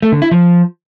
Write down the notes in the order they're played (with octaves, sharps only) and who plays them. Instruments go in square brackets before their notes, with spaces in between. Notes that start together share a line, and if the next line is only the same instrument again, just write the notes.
[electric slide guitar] A3
D3
E4
F3